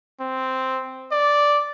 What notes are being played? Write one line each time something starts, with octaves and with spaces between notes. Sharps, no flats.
C4
D5